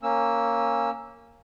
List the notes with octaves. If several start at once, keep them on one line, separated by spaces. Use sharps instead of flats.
A#3 C#4 E6